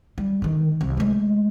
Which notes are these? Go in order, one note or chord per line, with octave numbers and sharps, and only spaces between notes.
G3
D3 D#3
C2
G#3 A3